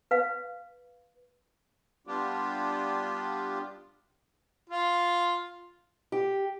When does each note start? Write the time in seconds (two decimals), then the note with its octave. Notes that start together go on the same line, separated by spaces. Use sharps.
0.11 B4 F5
2.07 G3 B3 D4 F4 G4
4.70 F4
6.12 G4